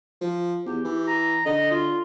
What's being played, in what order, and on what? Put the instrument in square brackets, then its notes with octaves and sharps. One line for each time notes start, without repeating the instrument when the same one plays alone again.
[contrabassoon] F3
[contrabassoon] E2 [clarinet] G4
[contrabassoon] E3
[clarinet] A#5
[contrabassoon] D3 [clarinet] D#5
[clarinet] F4